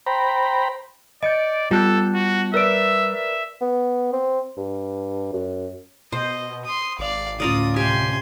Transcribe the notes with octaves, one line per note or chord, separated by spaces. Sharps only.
C5 G5 A#5 B5
D5 D#5 G6 C#7 D7
G3 B3 F4 A4 A5 F#6 G6
F#4
A#4 B4 D5 E5 E6 D7
E5
B3
C4
G2
F#2
B2 C5 D#5
C6 D#6
G#1 D5 F5
D2 A2 C#4 F4 A#4 D5 D#6
C3 G4 G#5 C6